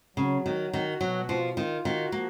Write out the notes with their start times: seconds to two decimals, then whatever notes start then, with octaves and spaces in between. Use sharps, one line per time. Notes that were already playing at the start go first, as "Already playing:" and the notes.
0.17 C#3 F#3
0.45 D#3 F#4
0.73 D#3 F#4
1.00 B2 F#3
1.29 F3 F4
1.57 D#3 F4
1.85 D#3 F#4
2.12 F3 A#3